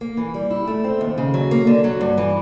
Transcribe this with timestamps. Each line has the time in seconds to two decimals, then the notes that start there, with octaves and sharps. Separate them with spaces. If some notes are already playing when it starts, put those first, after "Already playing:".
0.01 A#3
0.17 E3
0.34 G3
0.51 E4
0.67 A3
0.84 C4
1.01 D#2
1.18 C#3
1.34 F#3
1.51 A#3
1.67 D3
1.84 F#3
2.01 G2
2.17 E3